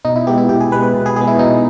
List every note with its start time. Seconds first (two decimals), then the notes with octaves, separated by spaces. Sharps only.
0.05 B2 D#4
0.16 E4
0.27 G#3 B3 G4
0.38 E4
0.49 B2 G4
0.60 G#4
0.71 G#3 B3 B4
0.83 B4
0.94 B2
1.06 G#4
1.16 G#3 B3 G#4
1.27 E4
1.39 B2 D#4